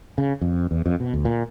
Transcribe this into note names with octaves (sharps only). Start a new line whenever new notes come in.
C#3
F2
E2
F2
B2
D2
A#2